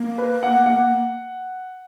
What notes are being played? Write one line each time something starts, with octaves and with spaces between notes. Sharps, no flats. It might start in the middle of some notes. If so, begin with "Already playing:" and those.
Already playing: A#3
B4
F#5
F#5